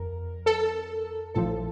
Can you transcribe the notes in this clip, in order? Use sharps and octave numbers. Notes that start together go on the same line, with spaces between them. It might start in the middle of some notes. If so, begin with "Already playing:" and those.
Already playing: F2 A#4
A4
A#1 A2 F3 A4